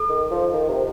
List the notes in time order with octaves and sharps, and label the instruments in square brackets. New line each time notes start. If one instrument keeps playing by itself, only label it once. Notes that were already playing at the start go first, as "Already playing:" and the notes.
Already playing: [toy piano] A4
[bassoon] D#3
F3
D#3
C3